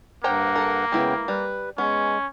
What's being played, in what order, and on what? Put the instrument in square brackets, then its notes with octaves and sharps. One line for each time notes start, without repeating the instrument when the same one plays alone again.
[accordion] G2 F#5 [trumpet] A#3 [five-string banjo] C5 G5 A#5
[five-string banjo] A4 A#4
[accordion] C#3 B3 G5 [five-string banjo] G#3 E4 B4
[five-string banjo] G3 [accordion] B4
[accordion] G#3 [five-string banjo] B3 [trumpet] C#4